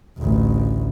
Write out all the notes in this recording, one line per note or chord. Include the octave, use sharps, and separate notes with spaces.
A1 D2